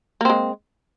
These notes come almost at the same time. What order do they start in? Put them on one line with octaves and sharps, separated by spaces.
A#3 C4 G#3